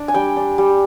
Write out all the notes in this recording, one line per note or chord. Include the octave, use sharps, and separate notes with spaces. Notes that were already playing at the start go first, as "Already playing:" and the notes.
Already playing: D4
G#5
G3 G5
D4
G3